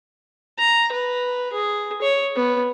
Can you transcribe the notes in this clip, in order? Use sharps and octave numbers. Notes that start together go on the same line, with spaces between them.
A#5
B4
G#4
C#5
B3